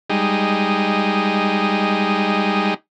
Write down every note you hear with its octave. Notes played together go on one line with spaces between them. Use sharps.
G3 G#3 D#4